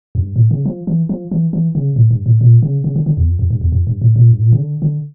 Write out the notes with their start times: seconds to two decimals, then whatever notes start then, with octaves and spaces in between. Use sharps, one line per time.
0.15 F2
0.21 G2
0.36 A2
0.51 C#3
0.66 F3
0.87 E3
1.09 F3
1.31 E3
1.53 E3
1.75 C#3
1.96 A2
2.11 G2
2.26 A2
2.41 A#2
2.63 C#3
2.84 C#3
2.96 D3
3.06 D3
3.17 E2
3.28 F2
3.39 F2
3.50 G2
3.61 E2
3.72 F2
3.87 G2
4.02 A2
4.16 A#2
4.31 G2
4.39 A2
4.45 A#2
4.52 C#3
4.60 D3
4.82 D3